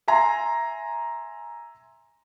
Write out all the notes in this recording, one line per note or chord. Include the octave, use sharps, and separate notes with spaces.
E5 G#5 A#5 C6